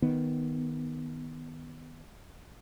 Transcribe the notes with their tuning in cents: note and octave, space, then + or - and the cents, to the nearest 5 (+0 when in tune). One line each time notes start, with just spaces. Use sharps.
D#3 +0 B3 +0